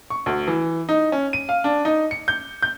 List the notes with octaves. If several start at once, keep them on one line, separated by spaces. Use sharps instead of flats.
C#6
D2
E3
D#4
C#4
D#7
F5
D4
D#4
C#7
G6
G6